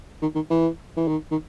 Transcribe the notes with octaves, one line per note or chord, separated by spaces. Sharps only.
D#3
D#3
E3
E3
D#3
D#3